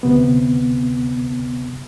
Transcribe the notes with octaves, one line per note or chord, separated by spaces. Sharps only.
D2 C3 B3